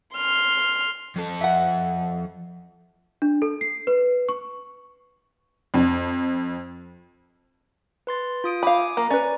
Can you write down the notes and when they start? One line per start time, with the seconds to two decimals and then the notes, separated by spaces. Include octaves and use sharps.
0.16 C6 F6
1.16 F2 A4
1.41 E5 F#5
3.22 D4
3.42 A4
3.61 C7
3.87 B4
4.29 C#6
5.74 F2
8.07 B4 C6 A6
8.44 F4 D#6 D7
8.63 F5 G#5 B5 D6 D#6
8.97 A#3 A#5
9.10 C#4 B4 D5